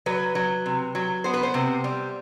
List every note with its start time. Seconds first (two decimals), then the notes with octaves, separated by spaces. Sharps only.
0.06 F#3 B4
0.35 F#3
0.66 C3
0.95 F#3
1.24 B3 C5
1.34 B4
1.43 C5
1.54 C3
1.84 G3